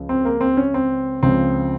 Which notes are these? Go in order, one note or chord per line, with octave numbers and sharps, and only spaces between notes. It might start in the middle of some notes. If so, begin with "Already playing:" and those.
Already playing: C#2 C#3 F3
C4
A#3
C4
C#4
C4
C#2 C#3 F3 C4